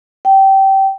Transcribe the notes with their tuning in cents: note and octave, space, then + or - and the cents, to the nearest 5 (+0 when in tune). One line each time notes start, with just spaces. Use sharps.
G5 -20